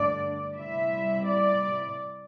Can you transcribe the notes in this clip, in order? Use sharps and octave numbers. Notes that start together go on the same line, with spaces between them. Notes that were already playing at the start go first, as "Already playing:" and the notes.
Already playing: G2 D3 A3 D4 D5
C3 G3 E4 E5
D5